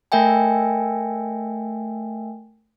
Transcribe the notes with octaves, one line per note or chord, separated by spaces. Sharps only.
A3 A#4 E5 G5 G#5